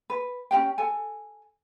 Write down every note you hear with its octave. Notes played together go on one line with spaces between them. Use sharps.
B4
C#4 D#4 G4 G5
A4 G#5